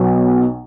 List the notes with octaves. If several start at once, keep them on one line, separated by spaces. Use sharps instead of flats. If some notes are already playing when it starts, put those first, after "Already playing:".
Already playing: B1 B2 F#3